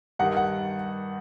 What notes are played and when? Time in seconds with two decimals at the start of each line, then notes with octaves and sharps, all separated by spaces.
0.19 G2 D#3 G3 F#5
0.37 F#5